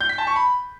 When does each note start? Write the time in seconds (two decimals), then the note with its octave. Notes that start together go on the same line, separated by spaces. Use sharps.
0.01 G6
0.09 B6
0.18 A5
0.27 C#6
0.36 B5